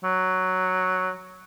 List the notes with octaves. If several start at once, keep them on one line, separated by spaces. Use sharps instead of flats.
F#3